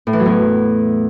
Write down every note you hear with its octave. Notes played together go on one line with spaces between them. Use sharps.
A2
E3
F#3
E2